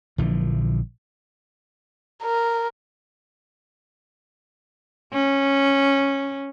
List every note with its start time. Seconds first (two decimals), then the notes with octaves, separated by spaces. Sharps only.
0.18 A#1 D3 E3 F3
2.23 A#4
5.13 C#4